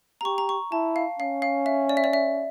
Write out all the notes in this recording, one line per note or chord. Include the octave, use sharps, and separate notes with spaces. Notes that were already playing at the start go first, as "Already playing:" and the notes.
A#5
G4 C#6
A#5
C#6
E4 A5
F5
C#4 F5
F5
E5
D5
E5
D5
E5